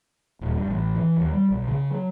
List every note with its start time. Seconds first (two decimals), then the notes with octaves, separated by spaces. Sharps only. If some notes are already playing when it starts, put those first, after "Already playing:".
0.41 D#1
0.55 G2
0.68 A1
0.95 E3
1.17 D#2
1.33 G3
1.50 B1
1.68 C#3
1.90 F#3